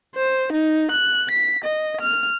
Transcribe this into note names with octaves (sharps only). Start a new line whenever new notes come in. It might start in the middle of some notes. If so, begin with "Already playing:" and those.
C5
D#4
F#6
B6
D#5
F6